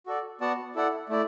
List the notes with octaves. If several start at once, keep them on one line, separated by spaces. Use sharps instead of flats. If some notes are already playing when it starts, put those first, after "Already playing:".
F#4 A4 D5
B3 F#4 D5 F#5 A5
E4 A4 D5 F#5
A3 E4 D5